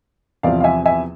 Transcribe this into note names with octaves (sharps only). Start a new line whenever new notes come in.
E2 C3 F3 D5 F5
F5
E5 G#5
E5 G#5